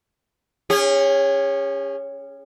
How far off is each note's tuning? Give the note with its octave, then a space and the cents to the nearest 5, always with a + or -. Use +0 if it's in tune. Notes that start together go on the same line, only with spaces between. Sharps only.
C#4 +0 G#4 -45